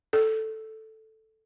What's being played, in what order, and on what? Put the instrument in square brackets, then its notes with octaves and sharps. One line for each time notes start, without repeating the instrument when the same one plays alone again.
[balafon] A4